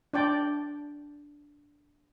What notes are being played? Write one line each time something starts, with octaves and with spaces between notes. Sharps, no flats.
D4 D5 G5